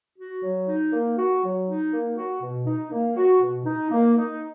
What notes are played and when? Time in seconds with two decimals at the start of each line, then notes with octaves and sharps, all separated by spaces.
0.17 F#4
0.42 F#3
0.67 D#4
0.91 A#3
1.17 F#4
1.42 F#3
1.67 D#4
1.91 A#3
2.17 F#4
2.42 B2
2.66 D#4
2.91 A#3
3.16 F#4
3.41 B2
3.66 D#4
3.91 A#3
4.16 D#4